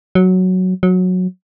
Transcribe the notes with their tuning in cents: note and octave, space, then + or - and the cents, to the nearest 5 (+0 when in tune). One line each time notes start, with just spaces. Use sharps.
F#3 +0
F#3 -15